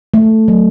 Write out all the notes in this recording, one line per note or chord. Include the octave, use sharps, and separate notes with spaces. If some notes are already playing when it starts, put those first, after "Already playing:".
A3
F#3